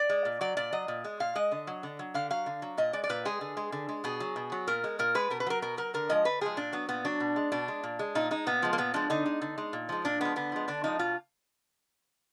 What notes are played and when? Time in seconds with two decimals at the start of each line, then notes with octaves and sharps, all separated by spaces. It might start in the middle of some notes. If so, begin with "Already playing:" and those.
Already playing: D5
0.09 G#3
0.25 A#2
0.41 F#3 D5
0.57 A#2 D5
0.73 F#3 D#5
0.88 A#2
1.04 G#3
1.20 A#2 F5
1.35 G#3 D#5
1.52 D3
1.67 F#3
1.83 D3
1.99 F#3
2.14 D3 F5
2.30 F#3 F5
2.46 D3
2.62 F#3
2.78 A#2 D#5
2.93 G#3 D5
3.04 D5
3.09 A#2 B4
3.25 G#3 G#4
3.41 D3
3.57 G#3
3.72 D3
3.89 G#3
4.04 B2 G#4
4.20 F#3
4.36 B2
4.52 F#3
4.67 A#2 A#4
4.84 G#3
4.99 A#2 A#4
5.15 G#3 B4
5.30 B2 A#4
5.40 B4
5.47 F#3 A#4
5.62 B2 A#4
5.77 F#3 A#4
5.94 D3 A#4
6.09 F3 G#3 D#5
6.25 D3 B4
6.41 F3 G#3 G#4
6.57 A#2 D4
6.73 F#3 B3
6.89 A#2 B3
7.05 F#3 D4
7.20 B2
7.36 G#3
7.52 B2 D4
7.68 G#3
7.83 A#2
7.99 G#3
8.15 A#2 D#4
8.31 G#3 D#4
8.46 A#2 B3
8.62 F3 G#3
8.73 A#3
8.78 A#2 B3
8.94 F3 G#3 D4
9.10 D3 D#4
9.26 G#3
9.41 D3
9.58 G#3
9.73 A#2
9.89 F3 G#3
10.05 A#2 D4
10.21 F3 G#3 B3
10.36 D3 B3
10.52 F3 G#3
10.68 D3 D4
10.84 F3 G#3 D#4
10.99 B2 F4